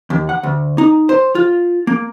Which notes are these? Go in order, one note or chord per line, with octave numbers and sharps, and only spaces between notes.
D#2
F#5
D2
D#4
C5
F4
A#3